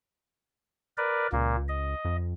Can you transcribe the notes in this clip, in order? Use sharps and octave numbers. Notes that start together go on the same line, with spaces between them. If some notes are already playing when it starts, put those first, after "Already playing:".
A#4 B4 D5
C#2 A#2 A#3
D#5
F2